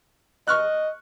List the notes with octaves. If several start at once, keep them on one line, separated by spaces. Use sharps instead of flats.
D#5 C#6 F6 F#6